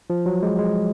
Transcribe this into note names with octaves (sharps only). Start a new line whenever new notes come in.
F3
F#3
G#3
G#3